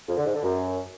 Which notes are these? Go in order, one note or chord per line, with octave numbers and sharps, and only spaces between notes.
F2
D3
G#2
D3
F#2